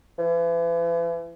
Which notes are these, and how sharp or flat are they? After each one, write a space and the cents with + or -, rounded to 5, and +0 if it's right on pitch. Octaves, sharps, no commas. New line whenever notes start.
E3 +40